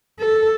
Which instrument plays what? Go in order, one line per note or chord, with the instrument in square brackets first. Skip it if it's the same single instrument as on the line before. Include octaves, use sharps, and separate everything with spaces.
[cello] A4